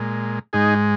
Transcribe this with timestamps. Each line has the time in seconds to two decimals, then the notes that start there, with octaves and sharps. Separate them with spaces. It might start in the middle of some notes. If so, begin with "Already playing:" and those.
Already playing: A#2 G#3
0.53 G#2 G#3 D#4 G#4